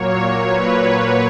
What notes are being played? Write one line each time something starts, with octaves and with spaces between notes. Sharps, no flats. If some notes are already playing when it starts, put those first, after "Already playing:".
Already playing: A#2 F#3 A#3 C#5
B4